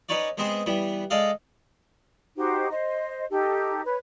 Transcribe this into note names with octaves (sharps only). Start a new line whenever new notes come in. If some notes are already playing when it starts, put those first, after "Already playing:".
C#4 D#4 B4 C#5 D5
G#3 B3 C4 G#4 C5
E3 G3 B3
G#3 A4 D5 D#5 F5
D#4 F#4 G4 C5
C5 D#5
D#4 G4 A4
B4 C#5